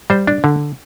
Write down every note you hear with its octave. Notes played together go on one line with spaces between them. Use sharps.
G3 C5
D4
D3